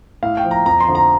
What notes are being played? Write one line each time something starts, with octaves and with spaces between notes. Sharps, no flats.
A2 F5
G5
F3
A#5
F2 A#5
C6
D3 F3
A#5